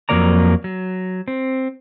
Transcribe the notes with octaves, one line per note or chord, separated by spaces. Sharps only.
F2 F#3 G3 A#3 D5 A#5
F#3
C4